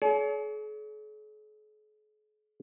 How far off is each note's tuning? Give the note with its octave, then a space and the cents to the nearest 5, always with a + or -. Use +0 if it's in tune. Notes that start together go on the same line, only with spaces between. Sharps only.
G#4 +45 C#5 +40